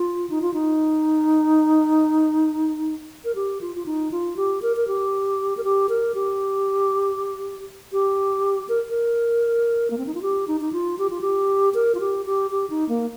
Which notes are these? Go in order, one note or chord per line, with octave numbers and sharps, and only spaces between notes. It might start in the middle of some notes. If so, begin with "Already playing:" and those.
Already playing: F4
D#4
F4
D#4
A#4
G4
F4
F4
D#4
F4
G4
A#4
A#4
G4
A#4
G4
A#4
G4
G4
A#4
A#4
A#3
C4
D#4
F4
G4
D#4
D#4
F4
G4
F4
G4
A#4
F4
G4
G4
G4
D#4
A#3